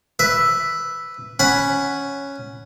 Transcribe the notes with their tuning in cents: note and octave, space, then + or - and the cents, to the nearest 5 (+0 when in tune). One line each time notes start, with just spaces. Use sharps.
B4 +0 E5 +0
C#4 +0 F#5 +0 B5 +0